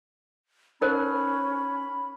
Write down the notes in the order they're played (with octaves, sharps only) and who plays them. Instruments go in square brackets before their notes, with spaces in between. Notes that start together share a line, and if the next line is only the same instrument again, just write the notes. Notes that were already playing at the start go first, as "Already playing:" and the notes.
[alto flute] C#4 [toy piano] D#4 A#4 C5 [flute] B5